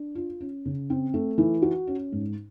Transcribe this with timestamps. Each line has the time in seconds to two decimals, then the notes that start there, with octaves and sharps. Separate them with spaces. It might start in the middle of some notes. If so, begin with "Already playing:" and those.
Already playing: D4
0.15 F4
0.41 C#4
0.65 C#3
0.90 C4
1.14 A3
1.38 E3
1.62 F#4
1.87 C#4
2.12 G#2